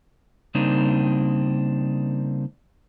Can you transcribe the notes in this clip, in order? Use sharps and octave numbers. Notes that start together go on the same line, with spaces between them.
C#3 G3 A#3 C4 D4 D#4